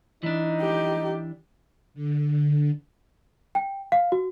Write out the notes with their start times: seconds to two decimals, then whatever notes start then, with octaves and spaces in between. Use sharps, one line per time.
0.23 E3 D4 D#4
0.61 G4
1.94 D3
3.55 G5
3.92 F5
4.12 F#4